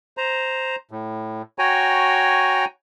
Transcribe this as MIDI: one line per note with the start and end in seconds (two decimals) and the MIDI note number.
0.17 0.76 72
0.17 0.76 82
0.91 1.42 45
1.59 2.65 66
1.59 2.65 73
1.59 2.65 79
1.59 2.65 80
1.59 2.65 82